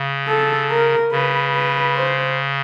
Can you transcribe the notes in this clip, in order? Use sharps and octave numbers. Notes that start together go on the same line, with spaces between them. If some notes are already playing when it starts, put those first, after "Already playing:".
Already playing: C#3
A4
A#4
C#3 B4
B4
C5